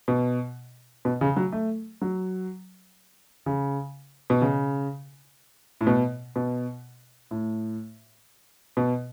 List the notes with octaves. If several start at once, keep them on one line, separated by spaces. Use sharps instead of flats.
B2
B2
C#3
F#3
A3
F#3
C#3
B2
C#3
A2
B2
B2
A2
B2